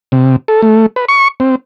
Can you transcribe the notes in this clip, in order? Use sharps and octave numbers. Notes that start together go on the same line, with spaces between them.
C3
A4
A3
B4
C#6
C4